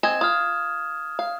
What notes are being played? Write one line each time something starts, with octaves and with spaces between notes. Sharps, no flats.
C4 D#5 G#5 G#6 E7
F4 D#6 F6
F5